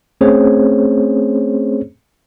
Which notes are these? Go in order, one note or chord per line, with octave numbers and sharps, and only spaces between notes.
A3 C4 C#4 G#4 C5 C#5